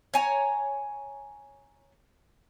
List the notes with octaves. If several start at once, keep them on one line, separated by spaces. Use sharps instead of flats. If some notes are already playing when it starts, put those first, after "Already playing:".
C#5 G#5 A#5